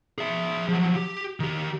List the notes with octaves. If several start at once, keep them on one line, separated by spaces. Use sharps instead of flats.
G#4 E5
F3 F#3
G4
D#3 G4